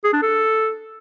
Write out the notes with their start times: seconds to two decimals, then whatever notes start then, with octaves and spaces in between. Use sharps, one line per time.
0.04 G#4
0.13 D4
0.22 A4